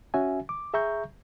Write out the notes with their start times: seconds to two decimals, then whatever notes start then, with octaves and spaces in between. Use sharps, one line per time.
0.14 C#4 F#4 E5 G#5
0.49 D6
0.74 G#4 E5 A#5 C#6 G6